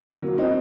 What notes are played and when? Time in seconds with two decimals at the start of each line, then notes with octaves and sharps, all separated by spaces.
0.22 F#3 A#3
0.38 C4 D#4